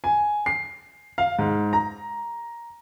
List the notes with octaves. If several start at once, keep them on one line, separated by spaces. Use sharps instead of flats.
G#5
C7
F5
G#2
A#5